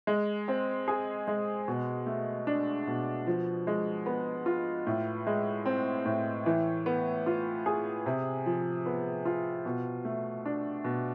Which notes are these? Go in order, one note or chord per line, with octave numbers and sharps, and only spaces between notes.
G#3
C4
G#4
G#3
B2
A3
D4
B2
F3
G#3
B3
F4
A2
G#3
C4
A2
E3
B3
F4
G#4
C3
F3
B3
F4
B2
A3
D4
B2